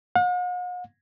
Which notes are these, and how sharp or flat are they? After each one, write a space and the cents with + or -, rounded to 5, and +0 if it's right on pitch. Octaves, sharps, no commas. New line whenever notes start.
F#5 -45